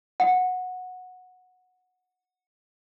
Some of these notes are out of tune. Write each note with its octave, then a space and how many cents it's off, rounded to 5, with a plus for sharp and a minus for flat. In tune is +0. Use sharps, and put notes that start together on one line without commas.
F#5 -15